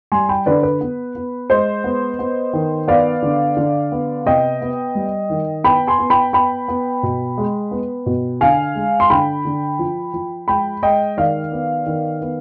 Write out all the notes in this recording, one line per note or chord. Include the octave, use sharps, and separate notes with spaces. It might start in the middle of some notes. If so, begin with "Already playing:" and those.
G3 G#5 C6
G5 B5
D3 B4 D5
B4
B3
B3
G#3 C5 D#5
B3
B3
D#3
B3 D5 F5
D3
D3
B3
C3 D#5 G5
B3
G3
D#3
B3 G5 B5
G#5 C6
B3
G5 B5
B3 G5 B5
B3
B2
G#3
B3
B2
D3 F5 G#5
G#3
C6
D3 G5 B5
D3
F3
F3
G#3 G5 B5
G#3 D#5 G5
D#3 D5 F5
B3
D#3
B3